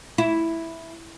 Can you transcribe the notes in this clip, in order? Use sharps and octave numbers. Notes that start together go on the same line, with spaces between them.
E4